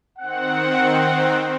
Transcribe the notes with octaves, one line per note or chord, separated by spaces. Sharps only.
D#3 C4 F#5